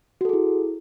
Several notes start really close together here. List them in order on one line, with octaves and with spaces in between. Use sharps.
F#4 A4 G#4 E4